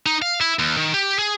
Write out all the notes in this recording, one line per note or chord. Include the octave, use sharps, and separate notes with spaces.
D#4
F5
E4
D#2
D#3
G4
G#4